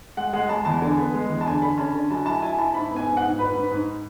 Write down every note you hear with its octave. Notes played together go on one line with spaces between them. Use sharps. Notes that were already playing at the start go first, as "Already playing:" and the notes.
G#3 F#5
G#3 F#5
G#3 A5
E2 A5
D3 G#5
B3
G#3
E2
A5
D3 G#5
D3 B5
C#4 A5
D3
F#3 A5
E4 A5
E4 G#5
E4 A5
G#2 B5
B3
G#5
G#2
F#5
G#2
G#2 B4
G#2
G#2